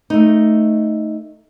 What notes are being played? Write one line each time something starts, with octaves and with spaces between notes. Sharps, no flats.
A3 D#4